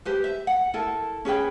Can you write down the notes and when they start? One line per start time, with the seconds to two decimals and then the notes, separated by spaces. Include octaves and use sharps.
0.05 G4 B4 C5
0.24 E5
0.47 F#5
0.74 E4 A4 A#4
1.25 C#4 G#4 B4 G5